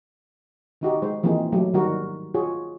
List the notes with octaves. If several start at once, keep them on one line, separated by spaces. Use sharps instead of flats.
D#3 D#4 F#4 G4
G#3 C5
E3 F3 A#3 C4 D#4 G#4
F#3 A3 G4
D#3 G3 F#4 A#4
F4 F#4 G#4 C#5